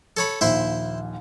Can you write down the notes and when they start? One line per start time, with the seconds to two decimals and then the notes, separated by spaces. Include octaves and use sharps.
0.17 A4 C#5 B5
0.41 A#1 D#2 E4 C5 E5